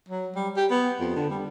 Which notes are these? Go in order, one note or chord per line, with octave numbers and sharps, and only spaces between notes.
F#3
G3
G4
B3
F2
D3
G3